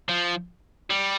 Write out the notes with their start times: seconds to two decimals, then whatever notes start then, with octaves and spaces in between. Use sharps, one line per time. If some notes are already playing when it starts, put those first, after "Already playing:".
0.09 F3
0.90 G3